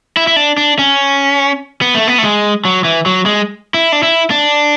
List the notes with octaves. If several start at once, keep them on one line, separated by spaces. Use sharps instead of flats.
E4
E4
D4
D4
C#4
B3
A3
B3
A3
G#3
F#3
E3
F#3
G#3
E4
D4
E4
D4